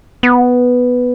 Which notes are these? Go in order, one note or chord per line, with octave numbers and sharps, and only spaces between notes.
B3